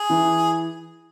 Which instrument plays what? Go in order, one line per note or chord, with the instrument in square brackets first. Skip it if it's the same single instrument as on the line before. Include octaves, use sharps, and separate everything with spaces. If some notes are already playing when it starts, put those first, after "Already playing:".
Already playing: [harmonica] G#4
[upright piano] E3